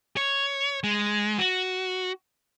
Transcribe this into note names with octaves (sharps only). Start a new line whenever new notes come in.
C#5
G#3
F#4